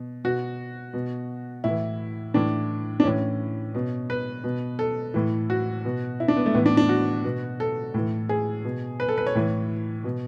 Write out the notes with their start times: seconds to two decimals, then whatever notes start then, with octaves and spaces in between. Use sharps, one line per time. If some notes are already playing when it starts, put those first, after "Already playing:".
Already playing: B2
0.24 B2 F#4
0.94 B2
1.64 A2 E3 E4
2.34 A2 E3 D4
3.00 D4
3.04 A2 E3 C#4
3.75 B2
4.10 B4
4.44 B2
4.79 A4
5.14 A2 E3
5.50 F#4
5.85 B2
6.20 E4
6.28 D4
6.36 B3
6.46 A3
6.54 A2 E3 B3
6.66 D4
6.77 D4
6.89 F#4
7.24 B2
7.60 A4
7.94 A2 E3
8.29 G#4
8.65 B2
9.00 B4
9.08 A4
9.18 B4
9.27 C#5
9.35 A2 E3
10.04 B2